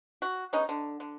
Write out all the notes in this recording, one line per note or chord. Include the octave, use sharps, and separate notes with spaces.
F#4
G#3 B3 C#4 D#4
D3
D3